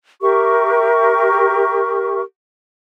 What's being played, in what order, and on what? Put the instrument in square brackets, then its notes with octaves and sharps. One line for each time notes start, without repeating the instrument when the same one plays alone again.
[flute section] G4 A#4 E5 C#6